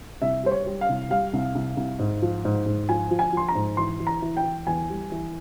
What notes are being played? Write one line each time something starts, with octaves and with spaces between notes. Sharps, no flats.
C2 E5
G3 C5
C#5
G3
F5
C2
G3 F5
C2
C2
C2
G#2
F3
G#2
G#2
F3 G#5
F3
G#5
F3 C6
A#5
G#2
E3 C6
E3
A#5
E3
G5
E3
E2 G#5
G3
E3